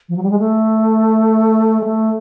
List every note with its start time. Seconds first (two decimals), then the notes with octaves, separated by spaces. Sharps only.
0.08 F3
0.16 F#3
0.22 G3
0.30 G#3
0.39 A3
1.80 G#3
1.84 A3